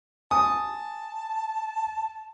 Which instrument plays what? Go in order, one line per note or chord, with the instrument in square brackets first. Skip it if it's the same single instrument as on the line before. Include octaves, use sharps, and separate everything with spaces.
[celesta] G#5 [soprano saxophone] A5 [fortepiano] D#6